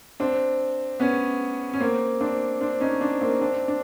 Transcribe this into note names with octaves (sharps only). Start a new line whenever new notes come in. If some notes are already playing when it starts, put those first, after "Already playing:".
C4 D4
B3 C#4
C#4
A#3 C4
C4 D4
C4 D4
C#4 D#4
C4 D4
A#3 C4
C4 D4
D4